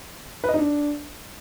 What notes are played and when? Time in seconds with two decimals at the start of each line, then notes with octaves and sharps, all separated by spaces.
0.44 B4
0.49 D#5
0.54 D#4
0.59 D4